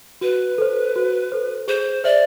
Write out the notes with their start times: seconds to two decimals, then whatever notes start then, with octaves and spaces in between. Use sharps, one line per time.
0.21 F#4 B4
0.58 A4 C5
0.96 F#4
1.32 A4 C5
1.68 G#4 C5
2.04 C5 D5 E5